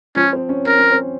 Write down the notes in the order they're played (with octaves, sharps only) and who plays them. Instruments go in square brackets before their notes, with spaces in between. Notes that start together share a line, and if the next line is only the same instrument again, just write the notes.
[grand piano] F3 [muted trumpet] C#4
[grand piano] C4
C#4
[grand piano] C#4 [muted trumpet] A#4
[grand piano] C#4
C4